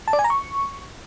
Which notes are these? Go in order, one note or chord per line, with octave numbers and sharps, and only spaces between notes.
A5
D5
G#5
A#5
C#6